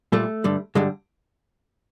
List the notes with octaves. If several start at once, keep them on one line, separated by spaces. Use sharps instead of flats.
A#2 G3 A3
G2 D3 G3
G2 D3 G3 G#3